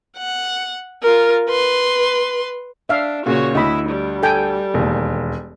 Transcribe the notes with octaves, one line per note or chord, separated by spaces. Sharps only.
F#5
F4 A#4
B4 C6
D4 E5 F5
A#2 C#3 F#4 C#5
D2 E4 D#5 B5
G3
A4 G5 G#5
E1 D#2